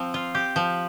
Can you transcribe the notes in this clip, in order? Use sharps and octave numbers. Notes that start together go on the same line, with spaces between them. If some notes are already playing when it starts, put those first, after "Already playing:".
Already playing: F3 C4
F4
G4
F3